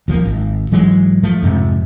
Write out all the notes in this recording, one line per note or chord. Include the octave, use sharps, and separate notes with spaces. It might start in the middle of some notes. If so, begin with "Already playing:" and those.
D#1 F3 G#3 A#3
G#1
G#2 E3 F#3 G#3
F3 A3
F2 G#2 C3